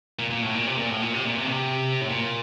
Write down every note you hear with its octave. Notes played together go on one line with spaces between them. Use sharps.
A#2
A#2
A2
A#2
C3
A#2
A2
A#2
C3
A#2
C3
C#3
C3
A2
A#2